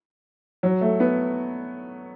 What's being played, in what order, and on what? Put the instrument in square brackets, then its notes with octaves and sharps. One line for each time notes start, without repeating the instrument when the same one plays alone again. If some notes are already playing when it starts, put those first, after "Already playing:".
[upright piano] F#3
A3
B3